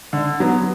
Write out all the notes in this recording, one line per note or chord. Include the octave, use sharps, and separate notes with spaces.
D3
F#3 B3